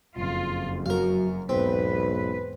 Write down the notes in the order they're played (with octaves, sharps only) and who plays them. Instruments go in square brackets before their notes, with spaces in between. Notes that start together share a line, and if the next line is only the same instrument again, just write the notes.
[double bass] F#1 F2 [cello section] F4
[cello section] F#2 [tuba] F#3 [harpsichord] A#4 F5
[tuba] B1 [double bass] E2 G#2 [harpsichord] C4 [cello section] B4